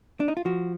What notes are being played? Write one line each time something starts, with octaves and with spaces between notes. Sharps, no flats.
D4
D#4
F4
F3 F#4